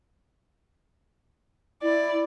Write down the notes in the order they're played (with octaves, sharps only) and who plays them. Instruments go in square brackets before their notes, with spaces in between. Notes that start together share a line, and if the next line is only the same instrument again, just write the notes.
[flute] E4 [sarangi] D5